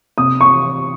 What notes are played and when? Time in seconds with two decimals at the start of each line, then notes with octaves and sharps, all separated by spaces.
0.18 C3 D#6
0.41 C#6